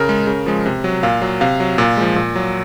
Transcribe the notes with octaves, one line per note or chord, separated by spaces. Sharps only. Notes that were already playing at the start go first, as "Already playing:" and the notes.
Already playing: C#3 A#4
G#3
C#3
F3 G#3
C3
F#3
A#2 F5
F#3
C3 F5
F#3
A#2
F3 G#3
A#2
F#3